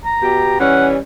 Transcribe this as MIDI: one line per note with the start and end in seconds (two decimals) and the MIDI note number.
0.05 0.57 82
0.22 0.60 47
0.22 0.60 67
0.60 0.97 52
0.60 0.97 55
0.60 0.97 61
0.60 0.87 78